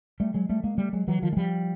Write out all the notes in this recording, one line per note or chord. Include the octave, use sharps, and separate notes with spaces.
G3 A3
F#3 G#3
G3 A3
G#3 A#3
G3 A3
F#3 G#3
E3 F#3
D#3 F3
G#3
F3 G3